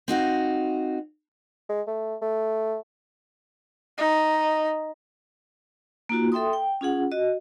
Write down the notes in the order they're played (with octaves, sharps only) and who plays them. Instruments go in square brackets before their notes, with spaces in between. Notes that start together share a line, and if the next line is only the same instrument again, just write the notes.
[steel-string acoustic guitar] C4 D#4 F#4 F5
[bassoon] G#3
A3
A3
[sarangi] D#4
[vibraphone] A#3 D#4 F4 F#4
A4 E5 G5 C6 D#6
G5
C#4 F4 G#4 F#5
F#4 D#5